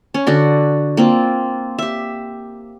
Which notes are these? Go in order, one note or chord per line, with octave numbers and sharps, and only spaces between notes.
C#4
D3 F#4 D5
A#3 C4 F4
G4 E5